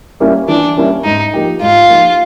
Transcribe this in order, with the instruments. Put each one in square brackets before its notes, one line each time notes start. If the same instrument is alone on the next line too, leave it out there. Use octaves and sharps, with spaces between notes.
[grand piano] G3 A#3 C#4 E4
[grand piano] E3 [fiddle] D4
[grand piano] G3 A#3 C#4 E4
[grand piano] G#2 [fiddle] D#4
[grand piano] F3 A#3 D#4 G4
[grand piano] G#2 [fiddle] F4
[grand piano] F3 A#3 D#4 G4